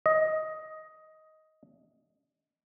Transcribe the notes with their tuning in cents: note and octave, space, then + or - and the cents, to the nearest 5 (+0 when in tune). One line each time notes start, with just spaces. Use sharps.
D#5 +10